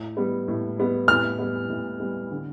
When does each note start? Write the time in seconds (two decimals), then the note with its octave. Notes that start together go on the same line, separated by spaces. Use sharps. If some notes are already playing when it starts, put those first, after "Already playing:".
Already playing: A2
0.17 G3 B3
0.48 A2
0.78 G3 B3
1.08 A2 F6
1.39 G3 B3
1.69 A2
2.00 G3 B3
2.31 D3